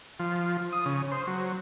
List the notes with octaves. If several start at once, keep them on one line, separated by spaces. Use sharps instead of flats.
F3
D#6
C#3
C5
F#3